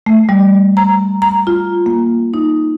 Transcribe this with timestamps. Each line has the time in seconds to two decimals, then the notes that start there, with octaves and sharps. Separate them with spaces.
0.06 A3
0.29 G3
0.77 A#5
1.22 A#5
1.47 F4
1.86 A#3
2.34 D#4